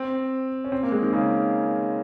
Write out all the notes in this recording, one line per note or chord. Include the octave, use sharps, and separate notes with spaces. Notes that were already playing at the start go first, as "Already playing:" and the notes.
Already playing: C4
C#4
C4
A#3
G#3
D#3
C#3